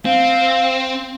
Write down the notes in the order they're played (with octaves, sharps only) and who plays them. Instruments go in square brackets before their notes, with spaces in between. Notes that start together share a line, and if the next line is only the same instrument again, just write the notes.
[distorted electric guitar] C4 [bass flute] F5